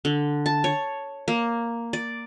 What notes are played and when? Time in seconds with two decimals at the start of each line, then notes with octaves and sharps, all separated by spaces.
0.05 D3
0.46 A5
0.64 C#5
1.28 A#3
1.93 D5